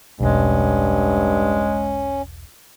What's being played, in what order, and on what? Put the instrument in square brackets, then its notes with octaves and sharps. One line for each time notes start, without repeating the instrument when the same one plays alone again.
[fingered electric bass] E1 B1 [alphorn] G2 [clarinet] G#3 [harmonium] C#4